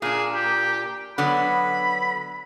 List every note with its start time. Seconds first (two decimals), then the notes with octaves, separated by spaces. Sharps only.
0.02 A#2 D4 G#4
0.34 G4
1.18 D3 F#3 B3 B5